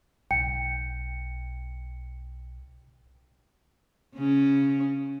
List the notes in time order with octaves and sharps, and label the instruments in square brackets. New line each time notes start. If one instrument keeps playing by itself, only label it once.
[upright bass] B1 [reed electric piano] G5 [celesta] C#7
[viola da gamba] C#3 C#4